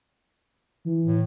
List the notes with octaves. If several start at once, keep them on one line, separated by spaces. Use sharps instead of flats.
E3
A2